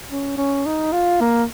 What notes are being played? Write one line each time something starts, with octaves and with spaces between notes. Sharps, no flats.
C#4
C#4
D#4
F4
A#3